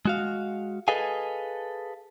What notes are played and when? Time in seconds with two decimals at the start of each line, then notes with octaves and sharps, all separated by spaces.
0.05 G#3 F#4 F5
0.88 G#4 A4 B4 D#5 F5 G#5